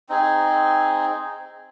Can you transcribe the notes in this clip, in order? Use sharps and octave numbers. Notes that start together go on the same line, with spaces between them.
C4 D#4 G#4